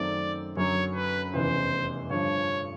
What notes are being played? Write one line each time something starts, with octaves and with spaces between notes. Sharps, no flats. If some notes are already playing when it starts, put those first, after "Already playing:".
Already playing: F#2 D#3 F#3 A3 C4 D5
F#2 D3 F#3 C#5
B4
F1 E2 C#3 E3 C5
G2 D3 F3 C#5